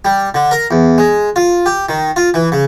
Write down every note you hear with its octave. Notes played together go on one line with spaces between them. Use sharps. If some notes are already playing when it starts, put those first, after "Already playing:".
G3
D3
A#4
E2
G#3
F4
G4
D#3
F4
E3
C#3